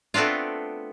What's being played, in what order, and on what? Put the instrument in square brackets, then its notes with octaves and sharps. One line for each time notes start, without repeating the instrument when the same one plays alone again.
[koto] A3 B3 C4 D4 F4